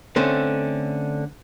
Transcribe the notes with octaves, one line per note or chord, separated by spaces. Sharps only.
D3 A3 C4 C#4